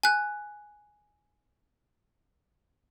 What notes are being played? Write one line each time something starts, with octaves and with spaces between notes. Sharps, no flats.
G#5 F#6